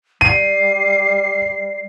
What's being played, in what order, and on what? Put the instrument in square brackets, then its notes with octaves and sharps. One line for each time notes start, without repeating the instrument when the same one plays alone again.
[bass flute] G3 [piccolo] C7 [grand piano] D#7